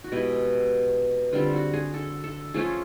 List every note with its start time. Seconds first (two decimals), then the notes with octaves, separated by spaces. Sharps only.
0.04 F#4
0.12 B2 G#3 B3 E4 G4
1.33 D3 G3 C4 F4
1.53 F#4
1.73 G#4
1.94 A4
2.24 A4
2.54 F3 A3 C#4 F4 G#4